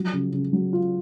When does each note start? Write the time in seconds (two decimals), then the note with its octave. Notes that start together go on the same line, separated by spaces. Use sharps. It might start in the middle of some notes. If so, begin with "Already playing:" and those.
Already playing: F3 F#3
0.13 C#3
0.33 C#3
0.53 F#3
0.73 F4